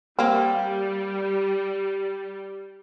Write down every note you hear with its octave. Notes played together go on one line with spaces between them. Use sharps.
G3 A#3 C4